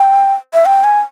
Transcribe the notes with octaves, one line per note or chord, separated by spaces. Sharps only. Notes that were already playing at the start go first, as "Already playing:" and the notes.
Already playing: G5
E5
G5
G#5